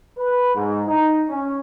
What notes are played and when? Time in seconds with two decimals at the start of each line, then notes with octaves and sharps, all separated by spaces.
0.17 B4
0.55 G#2
0.87 D#4
1.28 C#4